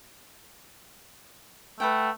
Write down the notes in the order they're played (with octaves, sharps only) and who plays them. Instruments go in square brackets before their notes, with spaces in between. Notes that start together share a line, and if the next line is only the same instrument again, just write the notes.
[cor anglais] A3 [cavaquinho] B4 F#5 G5